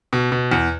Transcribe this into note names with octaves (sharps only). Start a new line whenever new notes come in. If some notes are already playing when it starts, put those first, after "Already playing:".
B2
B2
E2